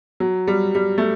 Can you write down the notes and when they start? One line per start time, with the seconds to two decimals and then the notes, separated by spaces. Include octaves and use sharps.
0.20 F#3
0.48 G3
0.75 G3
0.98 A3